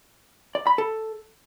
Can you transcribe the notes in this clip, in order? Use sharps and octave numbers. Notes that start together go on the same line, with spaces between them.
D5
B5
A4